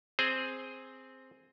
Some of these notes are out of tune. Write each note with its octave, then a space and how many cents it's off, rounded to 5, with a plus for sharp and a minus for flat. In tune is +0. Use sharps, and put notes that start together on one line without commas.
C4 +0 G#4 +0 C5 +0